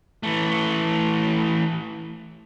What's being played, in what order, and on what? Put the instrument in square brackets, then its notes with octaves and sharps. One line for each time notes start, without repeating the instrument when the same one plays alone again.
[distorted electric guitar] E3 A3